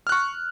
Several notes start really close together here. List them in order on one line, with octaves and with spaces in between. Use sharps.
F6 F#6 C#6